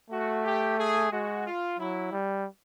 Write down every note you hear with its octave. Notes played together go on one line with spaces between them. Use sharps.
A3 F#4
G4
G#4
G#3 F#4
F4
F#3 E4
G3